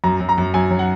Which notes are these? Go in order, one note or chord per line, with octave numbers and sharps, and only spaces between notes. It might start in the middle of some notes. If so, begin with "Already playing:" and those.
F#2 A#5
F#2
A#5
F#2
F#2 G#5
F#3
F#5